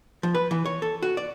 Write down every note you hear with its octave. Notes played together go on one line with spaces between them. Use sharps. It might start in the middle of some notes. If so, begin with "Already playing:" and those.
F3
B4
E3
C#5
A4
F#4
D5